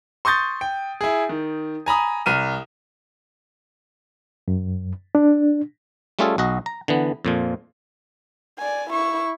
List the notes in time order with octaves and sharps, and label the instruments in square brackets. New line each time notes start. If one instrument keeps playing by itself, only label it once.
[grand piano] C6 C#6 D#6 G6 A6
G5
E4 G#4
D#3
G#5 A#5 B5 D#6
C2 F6 D#7
[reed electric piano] F#2
D4
[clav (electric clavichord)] G3 A3 C#4 F4 G#4 A4
B1 F#4 D#5
A#5
D3 E3 B3
F2 A#2 F3
[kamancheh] D5 G#5
E4 C#6